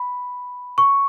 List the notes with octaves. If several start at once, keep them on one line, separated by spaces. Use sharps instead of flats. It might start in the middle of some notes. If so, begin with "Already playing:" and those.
Already playing: B5
C#6